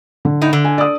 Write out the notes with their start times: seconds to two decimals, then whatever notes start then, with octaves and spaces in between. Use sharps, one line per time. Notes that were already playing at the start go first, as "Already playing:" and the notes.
0.25 D3
0.42 A2 D#4
0.53 D3
0.65 G#5
0.78 D5 D#6